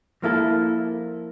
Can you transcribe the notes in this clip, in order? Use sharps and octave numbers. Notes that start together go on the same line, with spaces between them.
F3 A#3 E4 A4